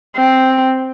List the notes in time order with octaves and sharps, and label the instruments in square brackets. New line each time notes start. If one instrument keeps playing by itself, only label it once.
[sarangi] C4